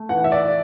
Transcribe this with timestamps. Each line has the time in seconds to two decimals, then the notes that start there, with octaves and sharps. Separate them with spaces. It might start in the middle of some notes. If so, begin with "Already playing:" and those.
Already playing: A3
0.09 E3 F#5
0.24 E5
0.32 D5